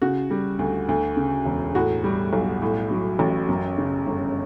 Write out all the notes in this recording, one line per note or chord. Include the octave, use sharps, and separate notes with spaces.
C#3 F#4
G3
D2
D2
C#3
E1
A2 F#4
G3
B1
A2
F#3
A1
F#2
C#3
G1